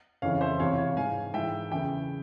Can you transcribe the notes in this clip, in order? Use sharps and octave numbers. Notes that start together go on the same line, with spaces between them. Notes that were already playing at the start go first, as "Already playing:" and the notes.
F2 C#3 E3 C#5 F5
C5 E5
E2 C3 E3 C#5 F5
C#5 F5
G#2 E3 F5 G#5
G#2 E3 E5 G5
E2 C#3 E3 E5 G5